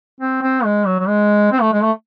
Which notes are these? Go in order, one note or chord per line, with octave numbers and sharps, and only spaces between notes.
C4
C4
G#3
F#3
F#3
G#3
C4
A3
G#3
A3